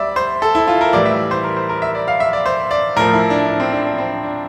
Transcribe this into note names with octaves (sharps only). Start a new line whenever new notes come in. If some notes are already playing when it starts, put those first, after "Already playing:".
Already playing: D2 G3 D5 E5
C5
A4
E4
F4
A#4
A2 E3 G3 D5
E5
C5
A#4
C5
A#4
E5
D5
F5
E5
D5
C5
D5
A2 F3 A#4
E4
D4
D4
C4
D4
D4
C4
D4